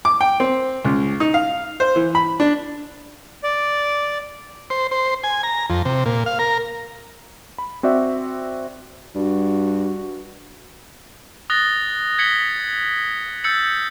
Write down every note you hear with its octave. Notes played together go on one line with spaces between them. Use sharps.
D6
G5
C4
C#2
D#4
F5
C5
E3
B5
D4
D5
C5
C5
G#5
A#5
F2
C3
A#2
F5
A#4
B5
C4 F#4 D5 E5
G2 F#4
D#6 F#6 A6 A#6 G7
G#6 B6 C#7 F#7 G7
E6 G6 A6 C#7 F#7